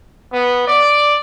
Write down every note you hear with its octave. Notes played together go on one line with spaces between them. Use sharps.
B3
D5